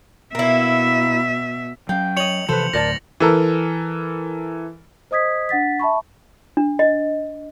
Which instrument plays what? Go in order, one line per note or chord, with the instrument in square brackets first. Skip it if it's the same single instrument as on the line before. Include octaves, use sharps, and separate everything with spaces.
[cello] B2 E5 [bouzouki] A#3 E4
[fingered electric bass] F#3 C#4 [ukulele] F5 [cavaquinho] G5
[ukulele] C#5 D#5 [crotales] C#7 F7 F#7
[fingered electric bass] C3 E3 F3 [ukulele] A4 B4 [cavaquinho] C5
[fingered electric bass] D2 A2 [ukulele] A#4 D5 A5 [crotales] A6 A#6
[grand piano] E3 A4 A#4
[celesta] C5 D#5 D#6 G#6 B6
D4 F#5 A6 B6
E5 A5 B5 C#6
[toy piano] D4
D#5